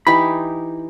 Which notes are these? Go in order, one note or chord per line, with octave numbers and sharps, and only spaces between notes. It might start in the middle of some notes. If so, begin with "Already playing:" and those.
E3 D#4 G4 B5